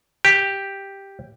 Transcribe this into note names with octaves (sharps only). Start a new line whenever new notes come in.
G4